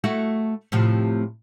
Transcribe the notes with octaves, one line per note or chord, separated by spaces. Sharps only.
A3 E4 F#4
A2 C3 F3